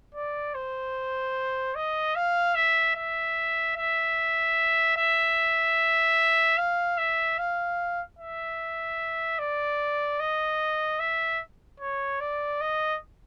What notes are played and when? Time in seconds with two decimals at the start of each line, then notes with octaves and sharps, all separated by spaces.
0.15 D5
0.54 C5
1.75 D#5
2.15 F5
2.55 E5
2.95 E5
3.76 E5
4.97 E5
6.58 F5
6.98 E5
7.38 F5
8.18 E5
9.39 D5
10.20 D#5
11.00 E5
11.80 C#5
12.20 D5
12.61 D#5